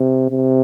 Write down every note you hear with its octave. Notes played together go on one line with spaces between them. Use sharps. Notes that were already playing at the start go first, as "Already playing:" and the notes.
Already playing: C3
C3